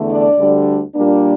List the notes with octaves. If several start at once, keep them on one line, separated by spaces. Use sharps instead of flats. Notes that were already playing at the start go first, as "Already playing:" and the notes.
Already playing: E2 D3 A3
D4 D5
D2 D3 G3 D4
A#2 G3 A#3 D4